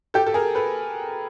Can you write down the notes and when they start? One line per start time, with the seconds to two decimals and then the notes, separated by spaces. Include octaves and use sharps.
0.14 G4 A4
0.26 A4
0.34 G#4 A#4
0.55 A4 B4